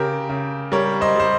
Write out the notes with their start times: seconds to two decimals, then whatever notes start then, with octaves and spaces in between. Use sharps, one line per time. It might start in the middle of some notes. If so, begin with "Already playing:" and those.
Already playing: C#3 G4 A#4
0.29 C#3
0.72 G3 A#4 C#5
1.01 C5 D#5
1.16 G3 C5